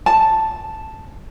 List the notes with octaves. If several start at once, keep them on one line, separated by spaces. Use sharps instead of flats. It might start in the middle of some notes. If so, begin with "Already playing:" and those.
A5